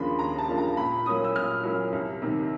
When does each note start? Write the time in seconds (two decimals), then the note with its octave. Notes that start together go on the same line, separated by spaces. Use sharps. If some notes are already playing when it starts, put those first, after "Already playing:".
Already playing: D#2 C#3 F3 A#3 D4 B5 C6
0.19 D#2 A#5
0.38 A5
0.48 C#3 F3 A#3 D4
0.58 A#5
0.77 A#2 B5
1.06 F#3 A#3 C#4 E4 D#6
1.24 E6
1.35 A#2 F6
1.63 F#3 A#3 C#4 E4
1.93 C2
2.22 C3 D#3